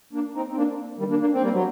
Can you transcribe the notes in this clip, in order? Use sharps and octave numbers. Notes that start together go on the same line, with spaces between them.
A#3 D4
C4 D#4
C4
A#3 D4
D#3 G3
A#3 D4
A#3 D4
C4
G3 A#3
F#3